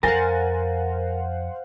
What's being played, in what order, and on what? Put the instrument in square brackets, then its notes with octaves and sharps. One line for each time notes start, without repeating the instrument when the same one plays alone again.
[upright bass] F2 [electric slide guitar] A#4 [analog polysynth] C5 F5 F#5 [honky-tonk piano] G#5 A6 A#6